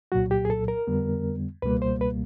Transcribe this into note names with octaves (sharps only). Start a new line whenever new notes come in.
C2 A#2 F#3 F#4
G4
G#4
A4
A#4
F2 D3 G3 B3
C#2 B2 G3 A#3 B4
C5
B4